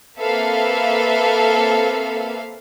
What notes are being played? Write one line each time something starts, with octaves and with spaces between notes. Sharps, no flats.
A#3 C4 A4 B4 E5 F5